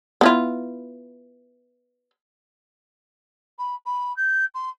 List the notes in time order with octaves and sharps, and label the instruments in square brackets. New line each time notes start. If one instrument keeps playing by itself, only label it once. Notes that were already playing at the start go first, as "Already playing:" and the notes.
[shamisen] B3 E4 F4
[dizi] B5
B5
G6
C6